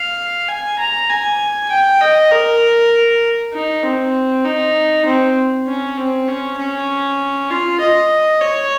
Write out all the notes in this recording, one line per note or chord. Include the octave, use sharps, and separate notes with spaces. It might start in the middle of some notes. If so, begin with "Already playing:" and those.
Already playing: F5
G#5
A#5
G#5
G5
D#5
A#4
D#4
C4
D#4
C4
C#4
C4
C#4
C#4
F4
D#5
C#5